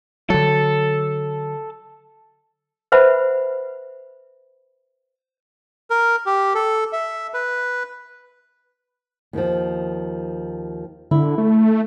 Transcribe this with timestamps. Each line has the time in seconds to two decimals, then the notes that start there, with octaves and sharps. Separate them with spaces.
0.30 D3 F#3 A4
2.92 B4 C5 E5 F#5 B5
5.90 A#4
6.26 G4
6.55 A4
6.93 E5
7.34 B4
9.33 D#2 D#3 F3
11.11 D3 E4
11.38 A3